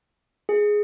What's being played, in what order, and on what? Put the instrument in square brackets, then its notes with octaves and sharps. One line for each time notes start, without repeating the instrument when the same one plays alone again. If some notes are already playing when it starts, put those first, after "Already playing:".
[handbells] G#4